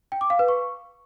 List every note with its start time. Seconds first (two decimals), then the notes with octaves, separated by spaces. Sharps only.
0.12 G5
0.21 D6
0.30 F5
0.39 B4
0.48 C#6